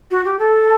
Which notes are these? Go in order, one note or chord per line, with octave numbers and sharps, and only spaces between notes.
F#4
G4
A4